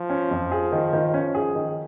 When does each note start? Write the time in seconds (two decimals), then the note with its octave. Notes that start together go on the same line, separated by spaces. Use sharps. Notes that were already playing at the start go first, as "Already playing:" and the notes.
Already playing: F3
0.10 C#4
0.31 F2
0.51 G#4
0.72 D#3
0.93 D#3
1.14 C#4
1.35 G#4
1.56 D#3